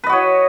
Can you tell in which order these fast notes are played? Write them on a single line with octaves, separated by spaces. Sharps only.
B4 D#5 F#4 C#5